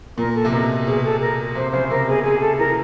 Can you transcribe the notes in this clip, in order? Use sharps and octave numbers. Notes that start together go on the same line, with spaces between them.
A#2 A#4
A4
C3
B2 A#4
B2 G#4
A4
A#4
C3 C5
C#3 C5
C3 A#4
B2 G#4
C3 G#4
A4
E3 A#4